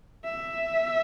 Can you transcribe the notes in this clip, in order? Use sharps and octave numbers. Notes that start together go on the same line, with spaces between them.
E5